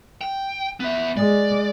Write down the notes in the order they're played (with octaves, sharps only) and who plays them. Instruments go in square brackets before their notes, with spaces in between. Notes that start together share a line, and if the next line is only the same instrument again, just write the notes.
[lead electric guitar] G5
B3 E5
[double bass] G#3 [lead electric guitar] D5